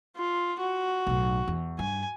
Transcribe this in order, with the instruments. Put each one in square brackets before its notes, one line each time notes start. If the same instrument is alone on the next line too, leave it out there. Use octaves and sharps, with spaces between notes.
[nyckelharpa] F4
F#4
[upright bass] B1 A2
E2
[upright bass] G2 [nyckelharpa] G#5